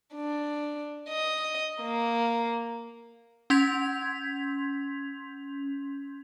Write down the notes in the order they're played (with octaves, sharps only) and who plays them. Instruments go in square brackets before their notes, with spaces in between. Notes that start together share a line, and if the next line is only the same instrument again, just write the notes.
[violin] D4
D#5
A#3
[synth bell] C#4 C6 G6 G#6 B6 F7